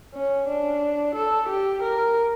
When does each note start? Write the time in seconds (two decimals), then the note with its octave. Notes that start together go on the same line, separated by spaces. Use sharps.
0.14 C#4
0.48 D4
1.15 A4
1.49 G4
1.83 A#4